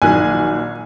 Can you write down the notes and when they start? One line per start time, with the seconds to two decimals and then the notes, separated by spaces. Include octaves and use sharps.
0.02 A#1 D#3 F#3 G#5 F#6